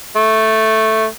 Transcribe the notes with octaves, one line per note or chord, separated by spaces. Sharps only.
A3